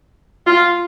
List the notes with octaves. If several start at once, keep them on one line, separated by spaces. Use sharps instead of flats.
F4